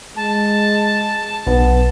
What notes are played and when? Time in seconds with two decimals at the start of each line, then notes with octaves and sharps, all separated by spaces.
0.16 G#3 A5
1.47 B1 B3